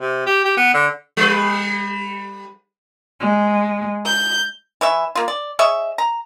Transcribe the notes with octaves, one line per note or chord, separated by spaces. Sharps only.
C3
G4
G4
B3
D3
G3 B4
G#3
G6
E3 C#5 E5
A#3 F4
D5
G#4 C#5 D#5 E5
A#5